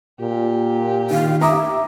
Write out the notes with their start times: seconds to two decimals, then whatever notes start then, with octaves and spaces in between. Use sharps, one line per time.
0.21 A#2 G4
1.10 D#3 F5
1.41 E5 A#5 D6 D#6